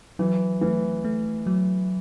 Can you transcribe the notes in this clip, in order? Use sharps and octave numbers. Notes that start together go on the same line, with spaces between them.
E3 F#3
E3 A3
A3
F#3